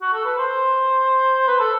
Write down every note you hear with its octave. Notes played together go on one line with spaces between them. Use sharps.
F#4
A4
B4
C5
B4
A4